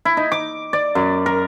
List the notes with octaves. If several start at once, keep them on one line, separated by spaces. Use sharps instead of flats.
E4
D#4
D6
D5
F#2
A#4